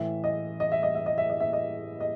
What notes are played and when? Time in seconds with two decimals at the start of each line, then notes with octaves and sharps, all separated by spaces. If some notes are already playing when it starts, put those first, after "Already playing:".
Already playing: A2 E3 E5
0.24 D#5
0.60 D#5
0.72 E5
0.83 D#5
0.95 E5
1.06 D#5
1.18 E5
1.30 D#5
1.40 E5
1.53 D#5
2.00 D#5